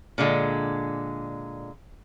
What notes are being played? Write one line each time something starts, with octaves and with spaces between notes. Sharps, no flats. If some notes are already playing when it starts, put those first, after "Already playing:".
A#2 D3 G#3